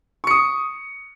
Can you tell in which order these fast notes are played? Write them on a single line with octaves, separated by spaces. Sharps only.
C#6 C#7 D#6